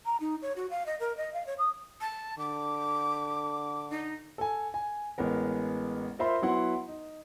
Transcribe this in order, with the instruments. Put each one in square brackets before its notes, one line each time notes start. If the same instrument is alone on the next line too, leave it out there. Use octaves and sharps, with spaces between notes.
[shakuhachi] A#5
D#4
C#5
F#4
F5
D#5
A#4
D#5
F5
C#5
D#6
A5
[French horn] D3 [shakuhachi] D6
[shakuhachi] D#4
[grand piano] A4 G#5
G#5
A1 G#3 B3 A#4
F4 A#4 C5 E5 B5 C6
F#3 B3 E4 F#5 C6
D#4